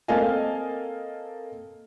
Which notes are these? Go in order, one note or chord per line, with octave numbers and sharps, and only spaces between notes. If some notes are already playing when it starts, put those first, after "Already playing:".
A#3 C4 A4 D#5 F5 G#5